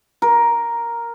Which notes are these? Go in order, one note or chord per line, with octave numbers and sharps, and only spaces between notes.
A#4